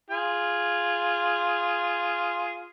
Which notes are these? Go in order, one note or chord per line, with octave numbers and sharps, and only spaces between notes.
F4 G#4